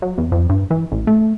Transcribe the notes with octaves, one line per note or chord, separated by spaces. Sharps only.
F#3
E2
F2
G2
E3
A1
A3